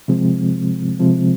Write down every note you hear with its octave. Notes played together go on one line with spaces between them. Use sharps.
C3 F3 G#3 C4
C3 F3 G#3 C4